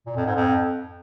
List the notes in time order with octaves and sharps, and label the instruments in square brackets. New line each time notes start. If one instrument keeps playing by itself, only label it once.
[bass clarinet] A#2
F2
G#2
F2